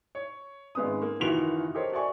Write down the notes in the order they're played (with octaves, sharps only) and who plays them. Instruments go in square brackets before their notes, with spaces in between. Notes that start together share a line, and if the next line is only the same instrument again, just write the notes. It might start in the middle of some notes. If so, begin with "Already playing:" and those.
[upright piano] C#5
G#1 G#3 B3 C#4 D#6
A#3
F#1 D#3 E3 F4 F#4 F7
G4 A4 A#4 C5 C#5 D#5
F#4 A4 D5 E5 G#5 C#6